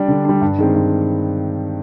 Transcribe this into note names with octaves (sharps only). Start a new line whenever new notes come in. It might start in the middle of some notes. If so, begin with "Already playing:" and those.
Already playing: G3 D4
D3
G3 D4
G2
D#3 G#3 C4
G2